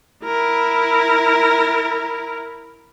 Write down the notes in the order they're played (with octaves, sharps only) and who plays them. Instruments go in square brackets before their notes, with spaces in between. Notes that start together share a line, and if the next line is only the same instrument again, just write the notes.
[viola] E4 A#4